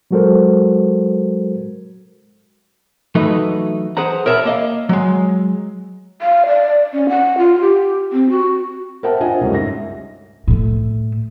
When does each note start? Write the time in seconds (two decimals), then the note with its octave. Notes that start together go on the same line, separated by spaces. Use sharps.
0.11 F#3 G#3 F#4 A4 A#4 C5
3.15 E3 F#3 A3 D#4 F#4 B4
3.97 G#4 B4 C5 F#5 A#5
4.26 A#4 C#5 E5 F5 A5 B5
4.45 A#3 D#5 F5
4.89 F#3 G#3
6.22 F5
6.46 D5
6.93 C#4
7.09 F#5
7.38 F4
7.61 G4
8.12 C4
8.30 F#4
9.03 A#4 C5 E5 F#5 G5 A5
9.20 D4 F4 C5 D#5 F#5 G#5
9.41 C#2 F#2 C#3 G3 A3 C#4
9.53 G#2 E5 A#6
10.48 A2 A3